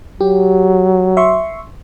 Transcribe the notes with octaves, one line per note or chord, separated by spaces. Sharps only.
F#3 G4
E5 C6 C#6